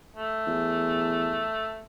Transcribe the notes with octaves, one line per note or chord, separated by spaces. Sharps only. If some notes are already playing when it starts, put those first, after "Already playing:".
A3
E2